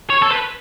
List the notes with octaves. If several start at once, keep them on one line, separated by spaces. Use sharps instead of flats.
C#5
A4
B4